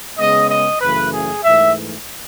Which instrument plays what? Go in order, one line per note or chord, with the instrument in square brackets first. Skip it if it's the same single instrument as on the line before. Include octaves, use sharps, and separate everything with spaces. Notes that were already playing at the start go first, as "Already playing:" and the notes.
[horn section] C#3 G#3 B3 D#5
D#5
F#2 C#3 E3 A3 B4
G#4
G#2 E3 A3 E5